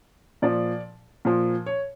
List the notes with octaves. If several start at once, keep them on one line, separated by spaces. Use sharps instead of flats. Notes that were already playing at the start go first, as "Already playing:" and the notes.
A#2 F3 D5
A#2 F3
C#5